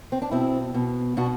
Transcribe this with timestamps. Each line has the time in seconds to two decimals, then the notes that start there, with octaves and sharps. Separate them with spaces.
0.12 C4
0.22 D4
0.31 B2 C4 E4
0.74 B2
1.17 B2 D4 F#4